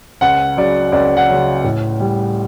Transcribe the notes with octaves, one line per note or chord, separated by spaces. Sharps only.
C#2 F#5
C#3 F#3 D5
C#2 D5
F#5
C#3 F#3
A2
G3